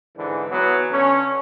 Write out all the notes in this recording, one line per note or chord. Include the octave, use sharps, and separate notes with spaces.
G#2 D3 E3
E3 F#3 B3
D3 C#4